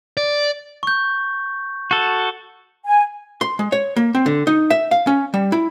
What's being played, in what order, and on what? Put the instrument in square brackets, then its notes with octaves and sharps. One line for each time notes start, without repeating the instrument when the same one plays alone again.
[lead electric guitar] D5
[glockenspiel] C#6 G6
[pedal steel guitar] F#4 A4
[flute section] G#5
[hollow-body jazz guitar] C6
G#3
C#5
A#3
C4
D3
D#4
E5
F5
C#4
G3
E4